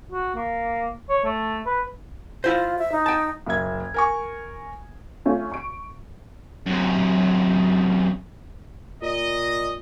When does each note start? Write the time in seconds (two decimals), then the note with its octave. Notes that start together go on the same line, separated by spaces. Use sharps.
0.12 F#4
0.35 A#3
1.09 C#5
1.24 A3
1.66 B4
2.44 E4 F4 C5
2.78 E5
2.92 D#4
3.06 G5 A5
3.46 F#1 A#3 A#4 E5 G#6
3.94 A#4 G#5 C#6
5.25 A3 C#4 F4
5.52 C#6 D7
6.67 F#2 C3
9.02 A#2 D#5